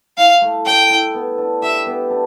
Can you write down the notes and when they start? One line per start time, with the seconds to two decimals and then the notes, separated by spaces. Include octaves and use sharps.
0.17 E4 F5
0.41 A3
0.65 A3 G5
0.90 E4
1.14 B3
1.38 D4
1.62 G4 E5
1.86 B3
2.10 D4